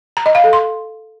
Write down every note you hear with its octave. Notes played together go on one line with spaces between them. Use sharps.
A#5
D#5
F5
A4
C6